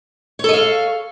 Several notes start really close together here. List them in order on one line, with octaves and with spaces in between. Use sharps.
C#5 A4 D#5 F5